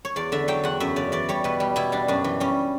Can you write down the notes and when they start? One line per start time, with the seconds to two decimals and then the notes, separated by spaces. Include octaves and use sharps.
0.05 C#5
0.16 E2 D5
0.32 D3 E5
0.48 F#3 G5
0.64 E2 F#5
0.80 F#2 E5
0.96 C#3 D5
1.12 E3 D5
1.29 G3 C#5
1.44 B2 B4
1.60 G3
1.76 B2 E4
1.92 G3 D4
2.08 F#2 D4
2.24 E3
2.40 G3 C#4